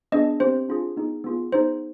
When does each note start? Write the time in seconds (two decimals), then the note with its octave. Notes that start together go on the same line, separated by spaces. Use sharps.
0.12 B3 D4 G#4 D#5
0.40 C4 G4 C5
0.69 D4 F4 G#4
0.97 B3 D#4 G#4
1.24 B3 F4 G#4
1.52 B3 D#4 G#4 C5